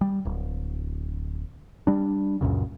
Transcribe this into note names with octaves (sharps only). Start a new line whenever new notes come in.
G3
D1
G3 D4
C#2 F#2 A#2 C#3